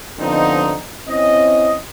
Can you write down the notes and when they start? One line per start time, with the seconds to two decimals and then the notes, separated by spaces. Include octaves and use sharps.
0.20 D3 F3 B3 C4 D#4
1.09 C4 C#4 E4 D#5